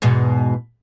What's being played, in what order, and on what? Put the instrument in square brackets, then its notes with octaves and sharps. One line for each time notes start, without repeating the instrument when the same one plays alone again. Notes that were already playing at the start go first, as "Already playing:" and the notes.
[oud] E2 G#2 B2